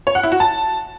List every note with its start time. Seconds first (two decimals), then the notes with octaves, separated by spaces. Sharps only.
0.07 C#5
0.15 F#5
0.23 E4
0.32 F#4
0.40 A5